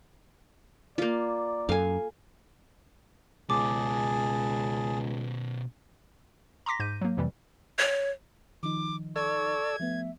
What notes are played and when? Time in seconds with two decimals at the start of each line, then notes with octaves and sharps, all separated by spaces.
0.98 A#3 F4 D5
1.69 F#2 A4 F5 G#5
3.50 C#2 B2 C#4 G#4 A5 D6
6.66 A#5 C6 D6 A#6 B6
6.80 G#2 G6 D#7
7.01 F#3 A#3
7.17 F2 C3 E3 G3
7.78 C#5
8.63 D#3 F3 D#4 D6
9.16 A4 D5 C#6 E6 G#6
9.80 F3 A3 B3 E5